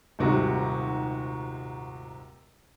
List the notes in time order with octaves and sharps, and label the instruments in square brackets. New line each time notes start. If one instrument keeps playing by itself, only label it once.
[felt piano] D#1 G#2 C3 F#4